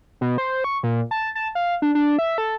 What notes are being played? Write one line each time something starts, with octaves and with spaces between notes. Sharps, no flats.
B2
C5
C#6
A#2
A5
A5
F5
D4
D4
E5
A4